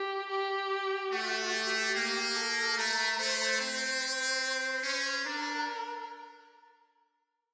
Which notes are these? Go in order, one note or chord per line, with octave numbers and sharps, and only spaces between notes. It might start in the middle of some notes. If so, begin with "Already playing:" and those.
Already playing: G4
G4
A3 F#4
G4
A#3
A4
A3 A#4
A3 C5
C4 C5
C#4
D4 A#4